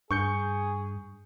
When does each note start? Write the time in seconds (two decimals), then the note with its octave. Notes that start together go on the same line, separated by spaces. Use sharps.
0.11 G2 G#4 C#6 G6 C#7